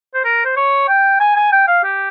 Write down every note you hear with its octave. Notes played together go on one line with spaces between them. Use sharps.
C5
A#4
C5
C#5
G5
G#5
G#5
G5
F5
G4